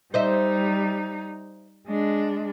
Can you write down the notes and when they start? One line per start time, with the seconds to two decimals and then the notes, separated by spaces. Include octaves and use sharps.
0.14 G3 D#4 C5 D#5 E5
1.88 G#3 D4